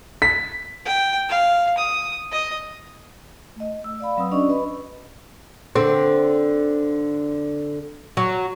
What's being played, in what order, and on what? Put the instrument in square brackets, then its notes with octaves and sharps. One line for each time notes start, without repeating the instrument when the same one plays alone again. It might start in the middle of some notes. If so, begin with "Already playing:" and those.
[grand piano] B6
[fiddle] G5
F5
D#6
D#5
[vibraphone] A3 D#5
E6
D5 F5 B5
F#3 C4 B4 D#6 E6
C#4 D4 F#4 D5 D#5 C#6
B4 D#5 B5
[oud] D3 C4
F#3